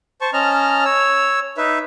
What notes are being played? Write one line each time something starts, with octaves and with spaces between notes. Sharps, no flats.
C5 A5 C#6
C#4 D#5 A5 A#5 F6
C#5 E6
D#4 B4 E5